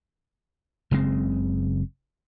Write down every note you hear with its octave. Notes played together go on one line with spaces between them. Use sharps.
F#1 C#3 G#3 C4